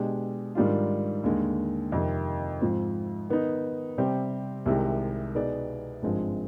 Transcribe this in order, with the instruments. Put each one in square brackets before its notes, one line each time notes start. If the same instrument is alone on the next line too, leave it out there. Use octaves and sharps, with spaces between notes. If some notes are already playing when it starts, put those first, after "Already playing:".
Already playing: [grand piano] B2 G#3 D4 G4
G#2 D#3 G3 D4 F4
D#2 D3 G#3
F2 C3 D#3
G#2 F3 C4 F4
D#3 B3 D#4
C3 G3 C4 G4
C2 C3 D#3 G#3
B2 B3 D#4 G#4 D5
G#1 G2 F3 G#3 C4